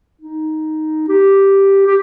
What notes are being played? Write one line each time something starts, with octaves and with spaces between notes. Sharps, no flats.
D#4
G4
G4